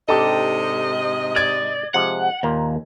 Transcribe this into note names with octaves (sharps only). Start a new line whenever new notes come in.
G#2 C3 D4 D#4 G4 A4 D#5 D6
D5 G#6
C3 F3 G#3 F#5
D#2 A#2 A#3